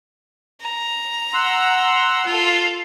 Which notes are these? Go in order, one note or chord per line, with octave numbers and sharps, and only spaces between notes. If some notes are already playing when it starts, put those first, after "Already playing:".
A#5
F#5 C6 E6
F4 A4